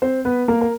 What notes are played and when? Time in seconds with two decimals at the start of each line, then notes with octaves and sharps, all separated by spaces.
0.02 C4 C5
0.25 B3 B4
0.48 A#3 A#4
0.61 A#4